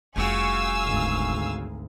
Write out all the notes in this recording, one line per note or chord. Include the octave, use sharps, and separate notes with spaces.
F1 C#3 G3 F#4 F5 G#5 E6
G#1 D2